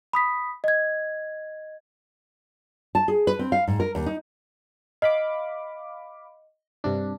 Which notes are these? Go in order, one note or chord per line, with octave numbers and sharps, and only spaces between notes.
B5 D#6 B6
D#5 G#6
A5
G#4
B4
C4
F5
G#2
A#4
D#2
D#4
D#5 F5 B5 D6
G2 C3 D4